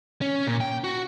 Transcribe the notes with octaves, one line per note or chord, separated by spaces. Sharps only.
C#4
A#2
G5
F#4